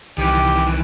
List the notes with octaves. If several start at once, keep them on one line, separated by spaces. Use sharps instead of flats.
C2 D#3 E3 G4